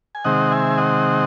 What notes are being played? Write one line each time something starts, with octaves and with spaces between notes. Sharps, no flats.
G#5
C3 D#3 G#3 C4 D#5 F#5
E5 G#5
D#5 F#5